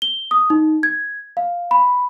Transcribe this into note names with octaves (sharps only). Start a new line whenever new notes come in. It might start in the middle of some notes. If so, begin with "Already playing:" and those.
G7
D#6
D#4
G#6
F5
B5